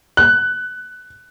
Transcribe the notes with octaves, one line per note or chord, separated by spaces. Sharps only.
F#6